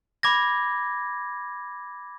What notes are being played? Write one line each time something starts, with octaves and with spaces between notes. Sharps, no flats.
B5 D6 G#6 A#6